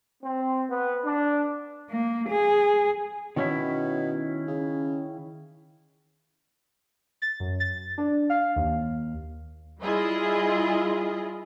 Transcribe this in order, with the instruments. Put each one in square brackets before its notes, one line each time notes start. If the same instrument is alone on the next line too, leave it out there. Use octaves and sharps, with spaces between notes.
[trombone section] C4
B3
D4
[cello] A#3
G#4
[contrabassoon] B2 [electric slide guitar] D#3 C#4 E4
[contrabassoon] C#3
[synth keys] A6
F#2
A6
D4
F5
D#2
[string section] G3 E4 F4 G#4 D#5